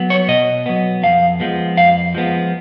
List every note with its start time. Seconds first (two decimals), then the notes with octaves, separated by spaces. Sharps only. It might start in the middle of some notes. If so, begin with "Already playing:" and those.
Already playing: F#3 B3
0.10 C#5
0.28 B2 D#5
0.66 F#3 B3
1.03 F2 F5
1.40 F3 G#3 B3
1.77 F2 F5
2.15 F3 G#3 B3